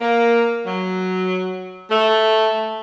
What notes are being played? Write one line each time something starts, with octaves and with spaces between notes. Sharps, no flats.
A#3
F#3
A3